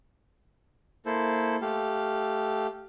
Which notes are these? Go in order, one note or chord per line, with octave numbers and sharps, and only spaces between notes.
A#3 E4 A4 C5
A3 G4 F5